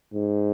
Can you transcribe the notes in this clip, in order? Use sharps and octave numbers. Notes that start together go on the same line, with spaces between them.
G#2